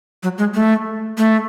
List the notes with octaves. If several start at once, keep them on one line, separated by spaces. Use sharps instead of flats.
F#3
G#3
A3
A3